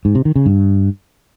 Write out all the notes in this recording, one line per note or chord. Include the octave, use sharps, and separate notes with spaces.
G#2
C3
D#3
C#3
G2